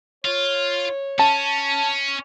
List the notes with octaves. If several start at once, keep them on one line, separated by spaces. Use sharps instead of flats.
F4 C#5
C#4 A5